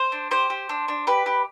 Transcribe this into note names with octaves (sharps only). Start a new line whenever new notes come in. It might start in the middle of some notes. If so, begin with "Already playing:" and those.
Already playing: C5
D4
G4 C5
G4
D4
D4
G4 B4
G4